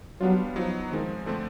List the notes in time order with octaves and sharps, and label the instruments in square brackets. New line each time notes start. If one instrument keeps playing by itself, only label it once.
[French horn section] F#3 [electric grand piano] G3 B3 D4 F4
[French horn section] F3 [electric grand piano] F#3 B3 D#4 F#4
[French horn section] D#3 [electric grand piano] F3 G#3 C4
[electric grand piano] D3 F3 A3 C4